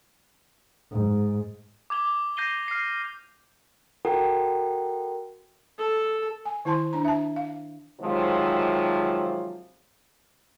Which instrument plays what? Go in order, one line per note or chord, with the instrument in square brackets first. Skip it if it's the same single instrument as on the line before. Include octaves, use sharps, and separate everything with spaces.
[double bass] G#2
[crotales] D6 G#6 F7 G7
D6 G6 A#6 C7 D#7 G7
F6 C7
[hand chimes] F#4 A4 A#4 F#5 G5
[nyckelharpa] A4
[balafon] G#5
D#3 E4 C5 A5 C6
D4 A#5
E5 A5
F5
[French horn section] C3 D#3 F3 F#3 G#3